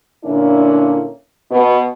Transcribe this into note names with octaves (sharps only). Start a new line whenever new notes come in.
A#2 D3 A#3 C#4 D4 E4
B2 B3